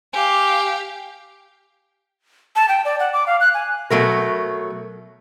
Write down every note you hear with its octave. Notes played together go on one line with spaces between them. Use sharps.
G4 F5 G#5 D6
A5
G5
D5
F#5
D6
F5
F#6
G#5
B2 F#3 A3 A#4